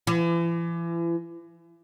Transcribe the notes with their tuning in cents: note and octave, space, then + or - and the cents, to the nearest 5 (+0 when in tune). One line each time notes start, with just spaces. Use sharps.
E3 +40